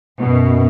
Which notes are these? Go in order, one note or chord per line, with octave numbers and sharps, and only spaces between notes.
F#2 B2